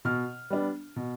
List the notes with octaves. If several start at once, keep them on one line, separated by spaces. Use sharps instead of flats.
B2 F6
G3 B3 D4
B2